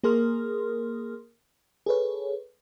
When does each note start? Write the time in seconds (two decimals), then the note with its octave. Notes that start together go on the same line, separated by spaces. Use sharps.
0.04 A#3 G#4 A#4 C6 D#6 F6
1.86 G#4 A4 B4 C#5